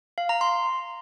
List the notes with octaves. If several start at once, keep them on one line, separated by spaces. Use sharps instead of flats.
F5
A#5
C6